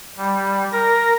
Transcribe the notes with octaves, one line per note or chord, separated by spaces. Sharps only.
G3
A#4 A#6